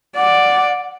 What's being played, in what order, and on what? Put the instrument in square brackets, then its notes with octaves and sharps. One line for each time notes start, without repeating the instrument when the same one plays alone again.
[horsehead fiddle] D5 [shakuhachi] F#5